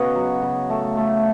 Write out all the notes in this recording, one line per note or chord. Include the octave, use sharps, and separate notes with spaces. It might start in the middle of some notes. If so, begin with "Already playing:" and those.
Already playing: C#3 B3 F#4 C#5 D#5
F#3
C#3
A3
A3